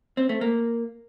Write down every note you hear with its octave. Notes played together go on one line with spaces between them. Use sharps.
C4
A3
A#3